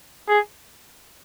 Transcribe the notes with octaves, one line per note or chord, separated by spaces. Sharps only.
G#4